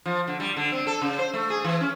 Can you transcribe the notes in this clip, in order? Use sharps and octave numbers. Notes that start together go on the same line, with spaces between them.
F3
D3
G3
D3
C4
A4
C#3
C5
A3
G#4
E3
C#4